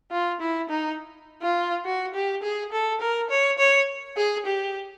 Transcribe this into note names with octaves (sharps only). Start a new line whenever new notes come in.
F4
E4
D#4
F4
F#4
G4
G#4
A4
A#4
C#5
C#5
G#4
G4